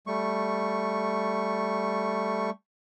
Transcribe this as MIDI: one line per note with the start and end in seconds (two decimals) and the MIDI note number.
0.07 2.50 55
0.07 2.50 57
0.07 2.50 85